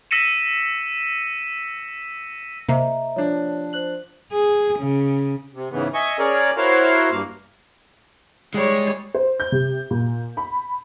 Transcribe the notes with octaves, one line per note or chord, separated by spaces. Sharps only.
E6 A#6 B6 C#7 D#7 E7
C3 A#3 D#5 E5 A#5
F3 D4 C#5
C5 F#6 F#7
G#4
C#3
C3
G#2 C#3 E3 B3
D#5 E5 G#5 C#6
C#4 G#4 A#4 C#5 D5
E4 F#4 A#4 C5 C#5 F5
G2 A#3 F5
G3 G#3 C#5
C5
G6
C3
A#2
B5